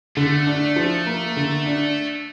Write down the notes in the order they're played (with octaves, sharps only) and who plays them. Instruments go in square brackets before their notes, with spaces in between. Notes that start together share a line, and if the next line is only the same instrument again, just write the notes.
[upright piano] D3 [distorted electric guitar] A3
[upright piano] D4
F3
A#3
D3
D4